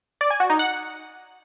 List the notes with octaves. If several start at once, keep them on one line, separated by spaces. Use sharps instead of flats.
D5
G#5
F#4
D#4
F#5